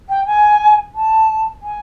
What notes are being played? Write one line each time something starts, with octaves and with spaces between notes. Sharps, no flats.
G5
G#5
A5
G#5